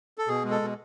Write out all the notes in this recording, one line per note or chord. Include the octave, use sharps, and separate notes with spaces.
A4
B2 G#4
G#3
A4
B2